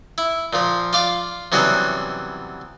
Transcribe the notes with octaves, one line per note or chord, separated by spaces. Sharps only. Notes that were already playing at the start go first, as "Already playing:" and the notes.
E4
A#2 F3
F4 D5 F5
C3 E3 F#3 G3 B3 C#4